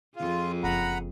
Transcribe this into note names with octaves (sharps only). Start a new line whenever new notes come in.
F2 F4 G#4
F#1 F#5 A#5 B5